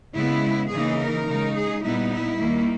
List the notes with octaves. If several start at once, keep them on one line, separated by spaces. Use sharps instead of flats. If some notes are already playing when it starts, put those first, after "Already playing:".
C#3 G#3 B3 E4
C#3 E3 A#3 D#4 G#4
A#4
C#3 G#3 D#4
G#4
A#2 G3 B3 D#4 E4
E4
D#2 D#3 G3 A#3